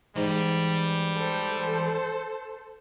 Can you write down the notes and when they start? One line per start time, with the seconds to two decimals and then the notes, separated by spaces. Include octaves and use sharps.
0.16 G#2 E3 G3 A#5
1.17 A4 C5